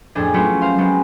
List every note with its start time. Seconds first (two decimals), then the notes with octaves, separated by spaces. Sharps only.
0.15 F2 A2 D4 G#4
0.34 F#3 A3 B3 C#4 E4 F4
0.61 C5 F5 C6
0.78 F#3 G#3 B3 C4